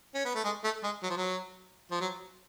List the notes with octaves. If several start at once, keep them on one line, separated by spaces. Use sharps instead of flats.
C#4
B3
A3
G#3
A3
G#3
F#3
F3
F#3
F3
F#3